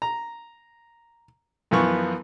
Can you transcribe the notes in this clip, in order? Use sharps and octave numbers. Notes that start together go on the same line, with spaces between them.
A#5
F#2 E3 F3 B3 C#6